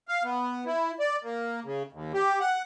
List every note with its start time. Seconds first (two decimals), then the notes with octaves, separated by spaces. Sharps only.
0.08 F5
0.24 B3
0.66 E4
1.00 D5
1.23 A#3
1.65 C#3
1.92 D#2
2.14 G4
2.40 F#5